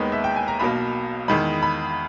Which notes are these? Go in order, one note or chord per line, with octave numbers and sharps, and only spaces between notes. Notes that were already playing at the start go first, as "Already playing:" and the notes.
Already playing: D#2 D#3 G#3 B3 B5
E5
G5
G#5
A#5
B1 B2 A#3 B5
E2 D#3 G#3 B5
B5